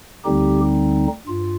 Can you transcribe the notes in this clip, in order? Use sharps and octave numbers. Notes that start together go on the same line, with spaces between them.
D2 D3 G3 C4 D#4 G4
G2 F4